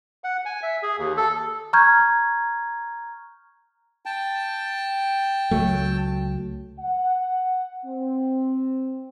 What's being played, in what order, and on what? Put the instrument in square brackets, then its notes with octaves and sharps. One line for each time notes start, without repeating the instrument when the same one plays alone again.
[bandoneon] F#5
G#5
E5
G#4
D#2
A4
[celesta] A#5 C#6 F6 G6 G#6
[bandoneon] G5 A5
[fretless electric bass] C#2 F#3 A3
[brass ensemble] F#5
C4